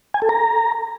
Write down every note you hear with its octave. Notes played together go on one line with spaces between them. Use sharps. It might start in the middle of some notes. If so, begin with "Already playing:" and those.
G#5
A4
A#5